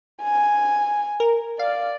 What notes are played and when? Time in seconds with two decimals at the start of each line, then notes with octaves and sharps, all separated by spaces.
0.22 G#5
1.20 A#4
1.59 D5 F5